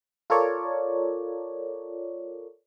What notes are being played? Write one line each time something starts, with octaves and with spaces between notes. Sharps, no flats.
F4 A4 A#4 C#5 D5